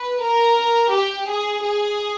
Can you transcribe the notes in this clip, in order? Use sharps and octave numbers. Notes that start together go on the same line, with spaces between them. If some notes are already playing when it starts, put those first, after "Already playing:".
Already playing: B4
A#4
G4
G#4
G#4